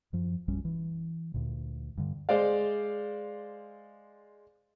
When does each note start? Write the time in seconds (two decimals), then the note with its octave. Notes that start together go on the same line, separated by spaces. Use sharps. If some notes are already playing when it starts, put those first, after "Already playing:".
0.13 F#2 F3
0.48 A#1 F#2 G3 C#4
0.65 E3
1.34 D2 A#2
1.98 G2 D3
2.29 G#3 C5 D5 F5